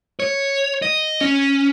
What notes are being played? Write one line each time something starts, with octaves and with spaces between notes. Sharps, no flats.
C#5
D#5
C#4